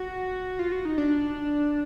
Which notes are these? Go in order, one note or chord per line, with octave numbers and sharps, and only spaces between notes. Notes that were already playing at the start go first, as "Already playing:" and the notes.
Already playing: F#4
F4
F#4
D#4
D4